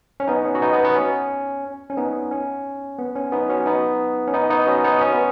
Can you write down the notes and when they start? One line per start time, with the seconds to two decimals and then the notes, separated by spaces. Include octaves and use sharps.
0.20 C#4
0.28 B3 D#4
0.45 C#4
0.55 F#4
0.62 B3 D#4
0.73 B3
0.85 B3
0.96 C#4
1.90 C#4
1.97 B3 D#4
2.31 C#4
2.98 B3
3.16 C#4
3.32 B3 D#4
3.49 C#4 F#4
3.66 B3 D#4
4.28 C#4
4.33 B3 D#4
4.50 B3 D#4
4.67 C#4 F#4
4.84 B3 D#4
5.01 C#4
5.12 B3